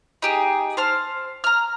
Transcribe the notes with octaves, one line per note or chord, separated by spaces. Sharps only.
D#4 G4 G#4
C5 A5 F6
A#5 F6